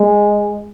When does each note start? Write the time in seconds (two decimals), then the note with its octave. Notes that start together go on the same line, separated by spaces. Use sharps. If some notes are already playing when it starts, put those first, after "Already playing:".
Already playing: G#3